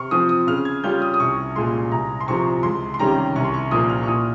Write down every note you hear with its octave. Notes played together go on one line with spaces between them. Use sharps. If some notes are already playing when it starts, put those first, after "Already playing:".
Already playing: C3 C6 C#6 F6
F3 C4 D#6
D#6
C#3 F6
G#6
G3 C#4 F4 G6
D#6
D#6
C2 C#6
A#2 G#3 C6
C2 A#5
C6
C3 F3 C#6
C#2 C6
C6
C3 D#3 G3 C#4 A#5
C2 C#6
C6
C#6
A#2 F3 A#3 D#6
F6
C#6
A#2 D#6